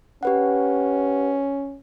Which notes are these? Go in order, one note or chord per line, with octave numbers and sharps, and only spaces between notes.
C#4 G4 B4 F#5